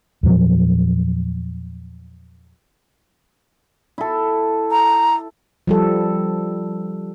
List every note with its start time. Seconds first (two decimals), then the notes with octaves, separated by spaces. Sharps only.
0.23 E2 A#2 F3 F#3
3.98 E4 A4
4.71 A#5
5.67 F3 G3 A4